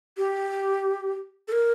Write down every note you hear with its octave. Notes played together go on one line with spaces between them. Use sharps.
G4
A4
A#4